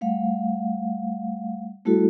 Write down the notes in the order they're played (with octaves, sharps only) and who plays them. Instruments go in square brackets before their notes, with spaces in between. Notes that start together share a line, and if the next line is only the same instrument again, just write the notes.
[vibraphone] G3 A3 F5 F#5
G3 A3 E4 F#4 A4